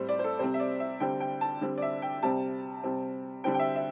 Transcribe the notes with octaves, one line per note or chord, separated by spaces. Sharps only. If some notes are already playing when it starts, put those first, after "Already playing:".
Already playing: A2 G3 C4 C5
D5
C5
A4
C3 G3 C4 C5
E5
D5
E5
D3 G3 C4 G5
G5
A5
D3 G3 C4
D5
E5
G5
C3 G3 C4 A5
C3 G3 C4
D3 G3 C4 G5
G5
E5
E5